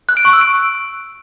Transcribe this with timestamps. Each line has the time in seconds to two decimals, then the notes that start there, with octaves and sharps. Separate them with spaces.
0.09 F#6
0.17 D7
0.25 C#6
0.33 E6
0.41 D7